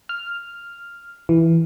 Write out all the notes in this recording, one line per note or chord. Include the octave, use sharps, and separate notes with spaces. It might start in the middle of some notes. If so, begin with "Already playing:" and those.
F6
E3